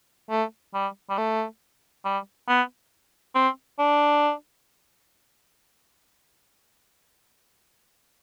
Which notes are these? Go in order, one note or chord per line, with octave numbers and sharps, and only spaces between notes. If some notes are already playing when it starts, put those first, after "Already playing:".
A3
G3
G3
A3
G3
B3
C4
D4